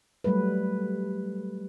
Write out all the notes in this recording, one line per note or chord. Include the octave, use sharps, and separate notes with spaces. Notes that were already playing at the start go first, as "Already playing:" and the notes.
F#3 G3 A3 A4 B4